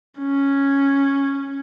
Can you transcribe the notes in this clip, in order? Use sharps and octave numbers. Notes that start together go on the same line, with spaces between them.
C#4